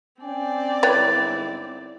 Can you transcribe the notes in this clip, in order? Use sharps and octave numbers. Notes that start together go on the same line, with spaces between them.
C4 C#4 D5 G5 G#5
G1 G#2 E4 B4 C#5 G5 A6